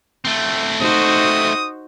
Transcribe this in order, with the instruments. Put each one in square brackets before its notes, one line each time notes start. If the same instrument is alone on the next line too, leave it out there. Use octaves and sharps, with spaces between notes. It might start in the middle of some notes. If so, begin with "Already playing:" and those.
[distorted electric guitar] A3 C4
[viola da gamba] D#4 F#4 C5 [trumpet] D#6